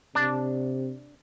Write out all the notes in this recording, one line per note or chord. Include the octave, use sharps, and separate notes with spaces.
C3 D4